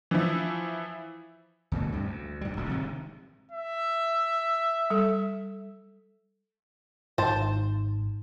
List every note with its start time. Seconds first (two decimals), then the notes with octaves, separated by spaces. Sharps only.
0.11 E3 F3 E4
1.72 D2 B2 E3 A3
1.92 G2 C3
2.05 D2
2.41 G#2 G3
2.56 D1 A1 D3 F#3
2.69 C3 D#3 G#3
3.52 E5
4.90 G3 A4
7.18 G#1 G#2 C5 A5